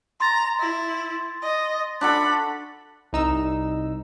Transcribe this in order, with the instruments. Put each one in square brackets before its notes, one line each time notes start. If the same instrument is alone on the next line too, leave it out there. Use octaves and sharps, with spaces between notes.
[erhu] A#5 [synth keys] C6 A6
[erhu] E4
D#5
[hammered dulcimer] D4 F#4 A4 [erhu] B5
[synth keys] C2 D#4 E6